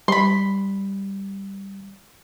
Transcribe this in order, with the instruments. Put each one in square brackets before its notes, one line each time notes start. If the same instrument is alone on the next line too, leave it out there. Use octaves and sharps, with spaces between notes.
[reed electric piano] G3 [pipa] B5 C6